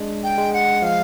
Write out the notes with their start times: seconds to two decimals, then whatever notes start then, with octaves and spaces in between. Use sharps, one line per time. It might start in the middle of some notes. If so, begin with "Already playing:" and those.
Already playing: G#3 D4
0.23 G5
0.38 G#3
0.53 F#5
0.82 F3 F5